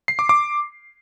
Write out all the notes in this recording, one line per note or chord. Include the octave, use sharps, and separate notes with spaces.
C7
D6
D6